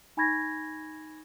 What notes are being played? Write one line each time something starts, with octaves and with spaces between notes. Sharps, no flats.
D#4 G#5 B5 C#6 G#6 A#6